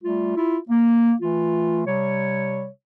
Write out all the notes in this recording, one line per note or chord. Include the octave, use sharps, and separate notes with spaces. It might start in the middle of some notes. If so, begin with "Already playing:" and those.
G3 A3 F4
E4 F4
A#3
E3 A3 F4
C3 G3 C#5